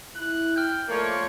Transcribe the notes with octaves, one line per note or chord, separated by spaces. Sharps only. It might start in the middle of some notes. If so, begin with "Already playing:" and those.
E4 F#6
G5 F6 G6
F3 A3 A#3 C#5 D5